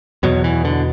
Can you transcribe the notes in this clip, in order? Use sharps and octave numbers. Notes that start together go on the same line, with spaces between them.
E2 B2 F#3
E3
D3